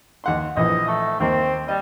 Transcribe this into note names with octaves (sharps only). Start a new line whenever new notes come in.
D#2 F#5 C6
A#1 E3 D#5
A3
D#2 A#3 C4
G3 D#5